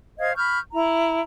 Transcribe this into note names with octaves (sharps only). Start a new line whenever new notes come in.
C5 D#5 F5 G#6
B5 C#6 F6 G6
E4 A#5